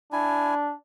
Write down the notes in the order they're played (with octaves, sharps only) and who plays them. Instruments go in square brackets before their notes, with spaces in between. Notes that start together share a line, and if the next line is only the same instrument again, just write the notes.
[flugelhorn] D4 [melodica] E4 G#5